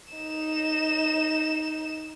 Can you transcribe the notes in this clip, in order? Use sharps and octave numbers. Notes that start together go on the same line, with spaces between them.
D#4 E7